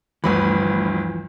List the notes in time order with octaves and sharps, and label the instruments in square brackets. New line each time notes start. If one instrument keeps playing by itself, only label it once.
[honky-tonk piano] G1 D2 B5 [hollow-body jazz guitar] E3 F3 B4